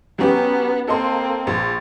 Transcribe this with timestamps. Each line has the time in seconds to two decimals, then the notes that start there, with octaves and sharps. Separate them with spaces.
0.19 F#3 B3 C#4 G4
0.88 A#3 C4 A4 D#5 C6
1.47 A#1